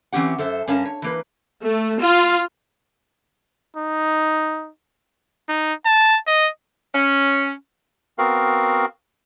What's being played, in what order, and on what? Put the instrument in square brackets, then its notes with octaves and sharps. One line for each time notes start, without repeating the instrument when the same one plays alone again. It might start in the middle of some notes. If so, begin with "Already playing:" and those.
[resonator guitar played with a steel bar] E3 C4 C#4 G4 F#5
F#2 A4 C5 E5
G2 C#4 A#4 F5 A5
C#5
E3 A#3 B4
[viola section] A3
F4
[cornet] D#4
[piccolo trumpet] D#4
A5
D#5
[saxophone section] C#4
[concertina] B3 C4 F#4 A#4 F5